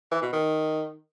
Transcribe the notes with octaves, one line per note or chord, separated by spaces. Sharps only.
E3
B2
D#3